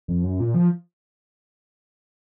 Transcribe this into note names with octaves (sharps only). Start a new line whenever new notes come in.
F2
F#2
A#2
F3